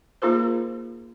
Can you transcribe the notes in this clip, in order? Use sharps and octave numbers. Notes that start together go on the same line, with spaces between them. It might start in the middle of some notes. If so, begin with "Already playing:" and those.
A#3 D#4 F4 G#4 A#4 C5